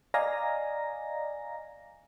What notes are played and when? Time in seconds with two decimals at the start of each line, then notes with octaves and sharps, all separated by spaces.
0.14 D5 D#5 F5 G#5 A#5 A#6